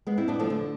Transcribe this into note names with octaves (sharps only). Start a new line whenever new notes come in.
G#3 B3
C4 E4
B3 D4
F3 A3
D3